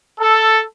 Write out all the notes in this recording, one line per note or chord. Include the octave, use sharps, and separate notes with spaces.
A4